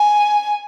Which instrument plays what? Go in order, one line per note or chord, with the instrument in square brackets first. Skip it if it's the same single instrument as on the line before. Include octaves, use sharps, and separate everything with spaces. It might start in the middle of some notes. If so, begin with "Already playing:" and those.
Already playing: [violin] G#5